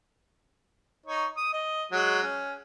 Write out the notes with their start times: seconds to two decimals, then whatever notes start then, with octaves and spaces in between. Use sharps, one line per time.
1.06 D#4 C#5
1.37 D#6
1.53 D#5
1.92 F#3 G#3 F#4
2.22 C#4